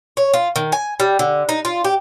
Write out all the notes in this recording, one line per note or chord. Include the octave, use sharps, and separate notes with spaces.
C#5
F4
D#3
G#5
G3
D3
D#4
F4
G4